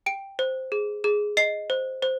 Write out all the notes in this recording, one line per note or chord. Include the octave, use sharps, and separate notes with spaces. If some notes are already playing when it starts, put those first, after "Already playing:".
G5 D7
C5
G#4
G#4
D#5 C7
C5
C5